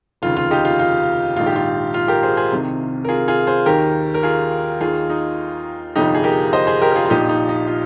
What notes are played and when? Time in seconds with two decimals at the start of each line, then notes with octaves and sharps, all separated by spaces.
0.22 F1 D#2 C#3 F4
0.36 F4
0.51 D#4 G4
0.65 F4
0.79 F4
1.36 A#1 G#2 D#3 F4
1.46 G4
1.56 F4
1.94 F4
2.08 G4 A#4
2.23 G#4 C5
2.37 G#4 C5
2.52 C2 C3 D#3
3.05 A#4
3.09 F4 G#4
3.28 F4 G#4
3.47 G#4 C5
3.66 D#2 D#3 G4 A#4
4.14 A#4
4.23 F4 G#4
4.81 D#2 D#3 F4 G#4
5.10 D#4
5.96 G1 F2 C3 F3 D#4 G4
6.15 G#4
6.24 G4 A#4
6.53 C5 D#5
6.67 G#4 C5
6.81 G4 A#4
6.91 A#4
6.95 F4 G#4
7.06 F4
7.10 A#1 A#2 F3 D#4 G4
7.29 D#4
7.49 D#4
7.67 F4